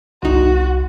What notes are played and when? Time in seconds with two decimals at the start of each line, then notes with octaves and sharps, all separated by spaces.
0.23 G1 C2 D#4 F#4